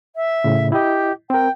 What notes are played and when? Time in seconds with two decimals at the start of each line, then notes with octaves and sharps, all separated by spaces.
0.15 E5
0.44 A2 C#3
0.72 E4 G4 D#5
1.30 C4 A#4 G5